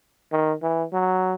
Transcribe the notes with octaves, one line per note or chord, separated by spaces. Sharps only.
D#3
E3
F#3